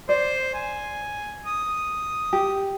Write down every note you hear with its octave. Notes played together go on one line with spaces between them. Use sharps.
C5 D5
G#5
D#6
G4